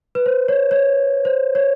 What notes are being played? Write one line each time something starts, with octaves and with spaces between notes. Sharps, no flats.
B4
C5
C#5
C#5
C5
C#5